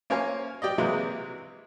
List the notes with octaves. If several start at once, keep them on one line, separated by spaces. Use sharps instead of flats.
A#3 C#4 C5 F5 G#5
G4 D5 D#5
C3 E3 F#3 G#3 A#3